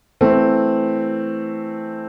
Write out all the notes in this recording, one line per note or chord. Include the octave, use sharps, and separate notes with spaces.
E3 A3 C4